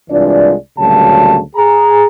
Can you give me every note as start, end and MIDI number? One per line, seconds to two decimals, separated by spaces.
0.10 0.54 36
0.10 0.54 52
0.10 0.54 56
0.10 0.54 62
0.10 0.54 65
0.10 0.54 74
0.77 1.38 38
0.77 1.38 46
0.77 1.38 49
0.77 1.38 54
0.77 1.38 55
0.77 1.38 81
1.55 2.06 68
1.55 2.06 82